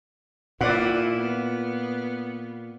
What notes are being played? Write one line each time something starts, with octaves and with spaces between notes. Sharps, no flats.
A#2 E4 F4 D5 F#5
B3